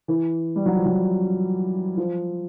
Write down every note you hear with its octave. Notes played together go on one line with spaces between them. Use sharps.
E3
G3
F#3
F3
F#3
F3